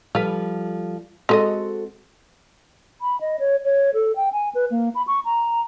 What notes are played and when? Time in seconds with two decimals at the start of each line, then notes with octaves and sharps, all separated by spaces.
0.15 F3 G3 F4 A4 B4
1.29 G#3 C4 F#4 A4 B4 D#5
3.01 B5
3.21 D#5
3.39 C#5
3.64 C#5
3.94 A4
4.16 G5
4.33 G#5
4.55 B4
4.71 A#3
4.95 B5
5.07 C#6
5.25 A#5